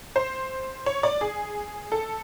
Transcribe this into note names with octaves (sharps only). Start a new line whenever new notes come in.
C5
C#5
D5
G#4
A4